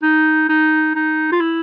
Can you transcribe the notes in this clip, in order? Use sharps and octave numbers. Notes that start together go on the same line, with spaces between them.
D#4
D#4
D#4
F4
E4